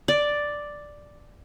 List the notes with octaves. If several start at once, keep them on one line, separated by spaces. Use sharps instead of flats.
D5